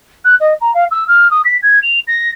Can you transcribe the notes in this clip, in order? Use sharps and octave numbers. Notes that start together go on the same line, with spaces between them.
F#6
D#5
A#5
F5
E6
F6
D#6
B6
G#6
F7
A#6